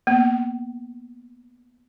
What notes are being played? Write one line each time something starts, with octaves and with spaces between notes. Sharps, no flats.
A#3 B3